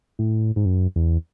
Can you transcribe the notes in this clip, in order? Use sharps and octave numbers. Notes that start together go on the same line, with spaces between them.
A2
G#2
F#2
E2